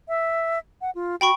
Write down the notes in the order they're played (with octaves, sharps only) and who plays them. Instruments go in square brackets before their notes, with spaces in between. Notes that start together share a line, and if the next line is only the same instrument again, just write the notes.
[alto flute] E5
F#5
F4
[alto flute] F#4 [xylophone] G5 B5 C#6